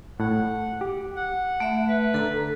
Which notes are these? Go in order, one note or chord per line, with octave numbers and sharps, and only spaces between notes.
A2 F#5
G4
F#5
A3 E5
B4
D3 A4 A#5